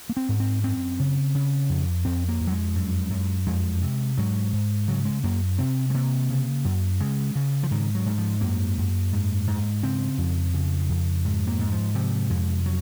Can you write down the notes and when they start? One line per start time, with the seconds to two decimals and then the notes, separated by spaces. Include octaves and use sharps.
0.09 A#3
0.17 C4
0.29 G#2
0.40 C4
0.63 F#2 C4
0.99 C#3
1.35 C#3
1.69 F2
2.05 F2 C4
2.28 A#3
2.40 F2
2.47 F#3
2.52 G#3
2.76 F#2
3.11 F#2
3.47 F2 G#3
3.82 C3
4.18 G#2 F#3
4.53 G#2
4.88 C#3 F#3
5.05 G#3
5.23 F#2 A#3
5.58 C3 C4
5.90 G#3
5.94 C3 A#3
6.30 C#3
6.65 F#2
7.00 C#3 G#3
7.35 C#3
7.63 F3
7.71 G#2 D#3
7.95 F#3
8.06 G#2
8.18 F3
8.41 F#2 A#3
8.77 F#2
9.13 G#2
9.47 G#2
9.83 C#3 C4
10.18 F2
10.54 C#3
10.89 F2
11.25 G#2
11.47 A#3
11.59 G#2
11.71 F3
11.95 C3 F3
12.30 F2 G#3
12.66 F#3